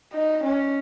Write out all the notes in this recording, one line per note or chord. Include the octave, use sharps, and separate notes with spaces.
D#4
C#4